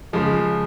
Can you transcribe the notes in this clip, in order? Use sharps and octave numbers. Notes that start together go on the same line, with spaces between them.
C#3 F3 G#3